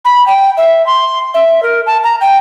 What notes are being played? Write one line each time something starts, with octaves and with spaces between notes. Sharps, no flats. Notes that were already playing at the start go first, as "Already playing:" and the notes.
B5
G5
E5
C6
E5
A#4
A5
A#5
G5